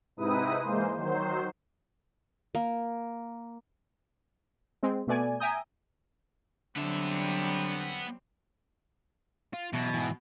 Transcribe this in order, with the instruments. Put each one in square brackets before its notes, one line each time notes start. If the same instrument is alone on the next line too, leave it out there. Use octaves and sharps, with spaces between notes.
[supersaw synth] G#2 C3 D#4 E4 B4 D#6
E3 G#3 A#3 C5
D#3 F#3 C5
[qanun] A#3
[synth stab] G#3 C4
B2 A3 B3 D5 G#5
E5 G5 G#5 A#5 D#6 G6
[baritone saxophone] D3 [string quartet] F#3 G3 C4 [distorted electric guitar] B3 E5
[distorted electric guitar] F4
[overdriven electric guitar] B2 [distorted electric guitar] E3 F#3
[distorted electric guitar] G#2 E3